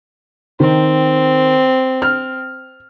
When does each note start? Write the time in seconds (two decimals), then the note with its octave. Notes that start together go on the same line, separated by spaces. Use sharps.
0.60 D#3 C4
2.02 F6